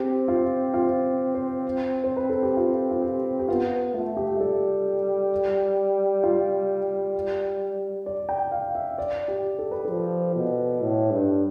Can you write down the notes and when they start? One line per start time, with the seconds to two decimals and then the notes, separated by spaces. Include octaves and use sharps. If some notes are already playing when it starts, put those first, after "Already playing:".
Already playing: C4 G4
0.28 F4
0.74 F4
1.35 C5
2.04 C5
2.16 B4
2.30 A4
2.43 G4
2.57 F4
2.91 F4
3.02 G4
3.39 G4
3.48 B3 F4
3.94 A3 F4
4.17 G4
4.39 G3 A4
6.23 F4
8.06 D5
8.29 G5
8.52 F5
8.75 E5
8.98 D5
9.28 G4
9.59 A4
9.71 B4
9.85 F3 A4
10.36 B2
10.81 A2
11.11 G2